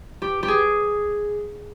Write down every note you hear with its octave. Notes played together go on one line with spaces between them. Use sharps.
G4
G4
G#4